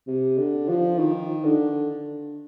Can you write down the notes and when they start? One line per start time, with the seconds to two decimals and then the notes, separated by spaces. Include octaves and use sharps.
0.07 C3
0.38 D3
0.69 F3
0.99 D#3
1.44 D3